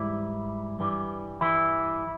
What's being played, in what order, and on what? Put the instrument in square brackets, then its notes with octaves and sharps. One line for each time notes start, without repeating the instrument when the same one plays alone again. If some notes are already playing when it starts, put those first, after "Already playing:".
Already playing: [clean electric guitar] G#2 E3 G3 E4
G2 E3 G3
E3 E4